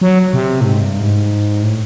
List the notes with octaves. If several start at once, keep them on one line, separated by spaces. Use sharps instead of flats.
F#3
C3
A2
G#2
G2
G#2
A2